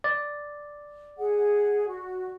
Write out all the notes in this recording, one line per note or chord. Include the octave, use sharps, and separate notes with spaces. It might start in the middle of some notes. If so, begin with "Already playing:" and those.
D5
G#4 F#5
F#4